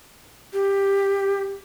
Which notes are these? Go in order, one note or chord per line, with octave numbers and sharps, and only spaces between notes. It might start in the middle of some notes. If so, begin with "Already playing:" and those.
G4